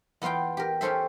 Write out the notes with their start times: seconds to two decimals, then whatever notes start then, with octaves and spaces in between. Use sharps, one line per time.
0.22 E2 B3 F4 F5 G5
0.57 G4 A#4
0.81 C#4 G4 A4 C5 E5